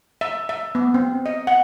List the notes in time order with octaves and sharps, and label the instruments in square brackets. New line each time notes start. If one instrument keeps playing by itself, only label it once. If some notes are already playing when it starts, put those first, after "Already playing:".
[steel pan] E5
E5
B3
C4
D#5
F#5